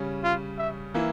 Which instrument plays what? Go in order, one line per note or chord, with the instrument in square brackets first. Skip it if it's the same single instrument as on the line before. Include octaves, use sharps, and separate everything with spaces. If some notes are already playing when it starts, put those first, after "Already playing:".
Already playing: [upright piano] C#3 G3 C#4
[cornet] F4
E5
[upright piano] E3 A#3 E4